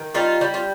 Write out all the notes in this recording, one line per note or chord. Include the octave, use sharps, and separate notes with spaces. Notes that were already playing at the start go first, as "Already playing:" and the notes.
Already playing: D#3
G3 D#4 F4
G3
F4